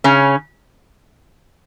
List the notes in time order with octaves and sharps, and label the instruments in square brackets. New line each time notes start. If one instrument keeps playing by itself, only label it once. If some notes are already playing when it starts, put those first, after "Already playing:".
[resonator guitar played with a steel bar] C#3 C#4